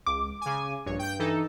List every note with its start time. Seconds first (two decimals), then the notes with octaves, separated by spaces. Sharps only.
0.06 C#2 D6
0.41 C#3 G#5
0.86 A#1 G2 C#5
0.99 G5 G6
1.19 E3 D#4 A4